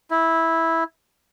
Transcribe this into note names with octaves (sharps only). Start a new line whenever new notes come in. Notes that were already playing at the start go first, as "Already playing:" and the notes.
E4